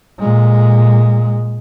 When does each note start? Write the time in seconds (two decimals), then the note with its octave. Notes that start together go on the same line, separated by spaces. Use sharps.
0.20 A#2 G#3